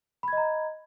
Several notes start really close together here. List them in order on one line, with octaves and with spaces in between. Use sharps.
B5 G#6 D#5 A#5